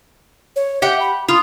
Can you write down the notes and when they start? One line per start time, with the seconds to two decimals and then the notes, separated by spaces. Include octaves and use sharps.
0.56 C#5
0.82 G4 E5 F#5 G5
1.00 B5
1.28 F4 D#6